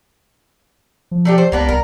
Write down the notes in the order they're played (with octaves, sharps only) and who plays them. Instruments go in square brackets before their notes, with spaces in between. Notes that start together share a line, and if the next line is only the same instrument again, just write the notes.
[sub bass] F3
[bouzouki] A3 D4 G4
C5
[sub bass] C#2 [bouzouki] A#3 B3 D4
[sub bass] C2 [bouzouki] A#4